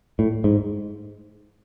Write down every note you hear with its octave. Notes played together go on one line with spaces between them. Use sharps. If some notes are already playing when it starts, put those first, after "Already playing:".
A2
G#2